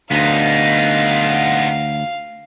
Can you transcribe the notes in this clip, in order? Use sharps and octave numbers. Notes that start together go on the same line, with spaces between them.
D2 B3 D#4 F5